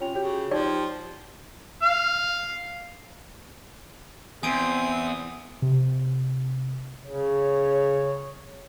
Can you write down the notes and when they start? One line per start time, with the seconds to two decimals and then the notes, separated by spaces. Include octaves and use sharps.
0.01 C3 C#4 F4 G5 F7
0.15 C#3 F#4 G4 G6
0.51 F3 D#4 G4 D5
1.83 F5
4.43 E2 C4 G#5 D#6 D7
5.62 C3
7.06 C#3 C#5